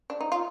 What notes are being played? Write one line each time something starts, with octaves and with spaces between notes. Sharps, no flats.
D4
D#4
F4